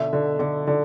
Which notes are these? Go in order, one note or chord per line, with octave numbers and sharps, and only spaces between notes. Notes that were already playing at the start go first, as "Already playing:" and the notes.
Already playing: B2 D3 E5
D3
D3
D3